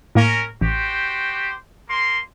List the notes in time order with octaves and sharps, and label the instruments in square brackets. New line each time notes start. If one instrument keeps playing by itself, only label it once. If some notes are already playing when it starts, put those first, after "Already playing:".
[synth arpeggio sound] A2 A#3 [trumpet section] C#4 A#4
[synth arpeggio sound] A1 [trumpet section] F#4 G4 C5
[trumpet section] A#3 C6